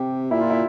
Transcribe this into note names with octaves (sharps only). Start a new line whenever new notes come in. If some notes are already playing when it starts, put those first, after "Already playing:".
Already playing: C3 G4
A#2 E4
F4
E4